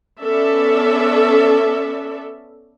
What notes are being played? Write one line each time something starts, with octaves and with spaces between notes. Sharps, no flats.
B3 C#4 A4 D5 E5